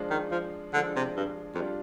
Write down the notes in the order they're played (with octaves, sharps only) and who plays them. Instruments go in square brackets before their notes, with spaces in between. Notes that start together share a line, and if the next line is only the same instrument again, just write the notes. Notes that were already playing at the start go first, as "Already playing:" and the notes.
Already playing: [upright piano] F3 G#3 D4 F4
[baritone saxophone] D#3
F3
[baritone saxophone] D3 [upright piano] F3 G#3 D4 F4
[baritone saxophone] C3
G2
F2
[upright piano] G3 D4 F4